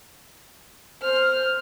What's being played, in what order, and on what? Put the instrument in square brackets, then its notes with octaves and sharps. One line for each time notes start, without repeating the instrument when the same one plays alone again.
[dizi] C5 [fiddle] F6